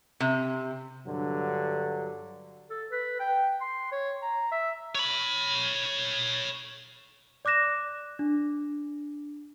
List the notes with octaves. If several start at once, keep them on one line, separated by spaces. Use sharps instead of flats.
C3
G2 D3 F#3
A4
B4
G5
C6
C#5
A#5
E5
C#5 B5
D5 D6 F#6 A#6 E7
D4